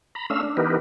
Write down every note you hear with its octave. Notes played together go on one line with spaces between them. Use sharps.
A#5 B5
A3 C#4 D4 F5 E6
D4
E3 B3 D#4 G4 A#4 B4